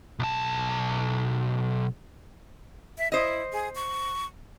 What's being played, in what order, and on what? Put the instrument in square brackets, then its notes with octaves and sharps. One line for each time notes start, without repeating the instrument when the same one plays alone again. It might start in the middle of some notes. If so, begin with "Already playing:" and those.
[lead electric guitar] B1 A5
[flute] E5
[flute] E4 [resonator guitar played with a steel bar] C5 D#5
[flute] G#4
C#6